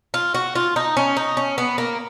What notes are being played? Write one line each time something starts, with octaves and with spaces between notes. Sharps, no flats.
F4
F#4
F4
D#4
C#4
D#4
C#4
B3
A#3